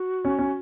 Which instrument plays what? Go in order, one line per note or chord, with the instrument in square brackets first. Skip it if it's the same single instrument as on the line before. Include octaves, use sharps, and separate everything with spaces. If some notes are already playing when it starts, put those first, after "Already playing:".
Already playing: [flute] F#4
[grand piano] C#4
C#4